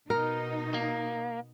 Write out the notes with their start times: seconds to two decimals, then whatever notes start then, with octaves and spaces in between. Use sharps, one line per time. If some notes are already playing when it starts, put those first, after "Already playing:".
0.10 B2 D#4 A#4
0.74 A#3